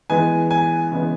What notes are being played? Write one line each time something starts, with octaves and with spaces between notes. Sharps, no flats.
E3 G#3 B3 G#5
G#5
C#3 E3 G#3 B3